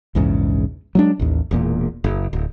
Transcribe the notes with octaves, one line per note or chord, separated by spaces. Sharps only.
A#1 E2 G#2 C#3
F#3 G#3 D4
A1 D#2
E1 E2 A#2
F#1
D1